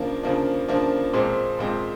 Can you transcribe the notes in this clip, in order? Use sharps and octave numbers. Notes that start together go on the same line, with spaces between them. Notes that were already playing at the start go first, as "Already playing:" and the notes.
Already playing: C#3 F3 A#3 D4
C#3 F3 A#3 D4
C#3 F3 A#3 D4
A#2 F3 G#3 C4
A#2 F3 G#3 C4